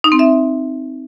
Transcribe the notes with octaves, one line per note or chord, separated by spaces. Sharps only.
D#4
C4
E5